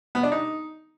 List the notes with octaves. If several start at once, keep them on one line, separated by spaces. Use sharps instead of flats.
B3
D4
D#4